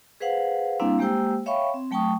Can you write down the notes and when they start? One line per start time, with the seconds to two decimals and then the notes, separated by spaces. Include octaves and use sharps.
0.20 G#4 B4 C5 F5 F#5
0.80 G3 A#3 C4 D4 E4 F5
0.99 G#3 A#3 G4 C5 G5 E6
1.46 C#5 E5 F5 G5 B5 C#6
1.74 C4
1.91 F#3 A3 G5 A5 C#6 D#6